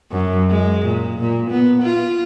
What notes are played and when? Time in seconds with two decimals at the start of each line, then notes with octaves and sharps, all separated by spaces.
0.11 F#2
0.50 G#3
0.85 A#2
1.19 A#2
1.50 B3
1.82 F4